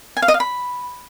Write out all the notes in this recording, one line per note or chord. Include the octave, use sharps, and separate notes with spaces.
G#5
F5
D#5
F5
B5